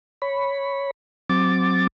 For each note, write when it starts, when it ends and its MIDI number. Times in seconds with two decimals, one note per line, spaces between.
0.22 0.91 73
0.22 0.91 83
1.29 1.87 54
1.29 1.87 60
1.29 1.87 86
1.29 1.87 93